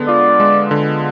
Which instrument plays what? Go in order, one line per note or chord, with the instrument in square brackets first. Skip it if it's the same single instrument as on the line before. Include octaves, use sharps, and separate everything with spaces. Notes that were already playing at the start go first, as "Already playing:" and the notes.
Already playing: [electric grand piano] D3 G#3 B3
[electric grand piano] F4 [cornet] D5
[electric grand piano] G#3
D3